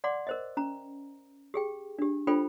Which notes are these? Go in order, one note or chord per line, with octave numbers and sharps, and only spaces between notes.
D5 F#5 C6 D6
A#4 C5 D#5
C#4 A#5
G4 G#4 G5
D4 G4
D4 F4 A4 C5 G5 B5